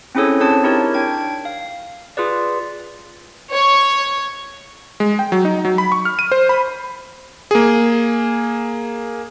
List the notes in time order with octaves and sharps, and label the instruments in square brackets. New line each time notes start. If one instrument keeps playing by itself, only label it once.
[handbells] C4 C#4 E4 G#4 A4 C#5
C4 D4 G#4 C#5 A5
D#4 E4 G4 A#4 C#5
D4 G5 G#6
F5
F4 G#4 B4 D5
[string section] C#5
[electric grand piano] G#3
G5
F#3
D#4
F#3
B5
C#6
F6
D#7
C5
B5
A#3 G#4